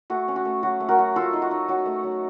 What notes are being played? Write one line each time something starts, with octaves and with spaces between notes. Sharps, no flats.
A3 F#4
C#4
F#4
A3
F#3 F#4
A3
F#4 A#4
F#3
A3 F4 A4
D#4
F#4
D#4
F#3 F#4
A3
F#3